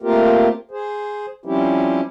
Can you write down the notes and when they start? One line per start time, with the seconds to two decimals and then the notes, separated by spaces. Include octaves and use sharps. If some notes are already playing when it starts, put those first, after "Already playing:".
0.02 A3 A#3 C4 F4 G4 A#4
0.71 G#4 C5
1.45 F3 G3 C4 C#4 E4 G4